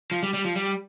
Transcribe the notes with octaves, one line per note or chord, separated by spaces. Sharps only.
F3
G3
G3
F3
G3